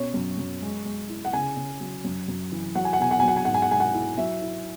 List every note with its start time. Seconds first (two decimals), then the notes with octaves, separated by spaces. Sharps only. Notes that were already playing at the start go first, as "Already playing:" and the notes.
Already playing: B2 C#4 C#5
0.14 F#2
0.38 F#2
0.62 G#3
0.85 G#3
1.09 E4
1.25 F#5
1.33 C#3 G#5
1.56 C#3
1.80 F#3
2.04 F#2
2.28 F#2
2.52 E3
2.75 F#3 F#5
2.85 G#5
2.93 F#5
2.99 B2 G#5
3.11 F#5
3.19 F#3 G#5
3.28 F#5
3.36 G#5
3.45 G#2 F#5
3.54 G#5
3.62 F#5
3.71 G#3 G#5
3.80 F#5
3.94 E4
4.18 F#3 E5
4.42 E4